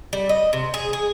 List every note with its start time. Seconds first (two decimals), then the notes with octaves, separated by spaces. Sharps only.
0.13 G3
0.29 D#5
0.53 C3
0.74 G#4
0.93 G#4